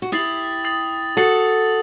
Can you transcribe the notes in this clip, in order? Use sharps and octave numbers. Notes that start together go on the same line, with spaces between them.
F#4
E4 G4 D#6 A6 C7 F#7
D#6 A6 C7 F#7
F#4 A4 D#6 A6 C7 F#7